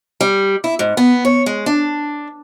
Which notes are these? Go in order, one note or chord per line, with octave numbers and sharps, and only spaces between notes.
G3
E4
G#2
B3
C#5
G#3
D4